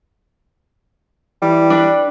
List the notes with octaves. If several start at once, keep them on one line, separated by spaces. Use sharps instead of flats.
E3 G3
D4 B4